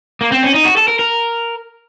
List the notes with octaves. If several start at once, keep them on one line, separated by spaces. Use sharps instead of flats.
A#3
C4
C#4
D#4
F#4
A4
A#4
A#4